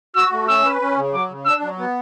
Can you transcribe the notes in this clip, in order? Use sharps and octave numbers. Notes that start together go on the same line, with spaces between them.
F#4 E6
A3
C#4 E6
B4
C#4
C#3
F#3 D6
C#3
D4 E6
F#3
B3